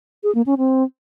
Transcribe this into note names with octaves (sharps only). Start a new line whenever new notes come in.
G#4
A#3
C#4
C4